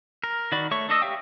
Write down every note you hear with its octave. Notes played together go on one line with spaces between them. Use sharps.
A#4
D#3 F#4 D5 B5
A3 C#5 C#6
D4 A4 D#5 E6
G4 C#5 E5 F5 G5